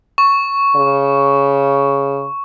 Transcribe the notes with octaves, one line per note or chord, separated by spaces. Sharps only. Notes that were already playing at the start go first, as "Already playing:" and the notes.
C#6
C#3